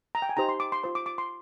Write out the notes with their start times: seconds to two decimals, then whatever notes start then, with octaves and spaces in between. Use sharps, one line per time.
0.15 A#5
0.22 G5
0.29 G#5
0.37 D#4 G4 C5 A#5
0.49 C6
0.60 D6
0.72 C6
0.83 F4 C5 C6
0.95 D6
1.06 D6
1.18 C6